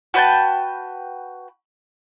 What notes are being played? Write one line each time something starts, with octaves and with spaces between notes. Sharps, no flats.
F#4 B4 G5 A5